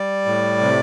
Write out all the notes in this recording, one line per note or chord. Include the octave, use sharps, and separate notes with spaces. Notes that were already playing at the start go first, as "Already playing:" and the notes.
Already playing: G3 D5
A2
C3